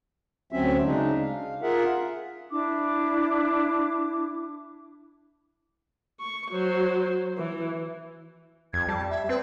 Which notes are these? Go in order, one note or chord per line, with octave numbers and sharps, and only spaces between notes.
D2 F#3 C4 C#4 E5
C#3 G#3 D4 D#4
F5
F4 G#4 A#4 E5 F#5
D4 E4 D6
C#6
F#3 C5
E3
F2 G#6
G3 A5
E5
C4 B4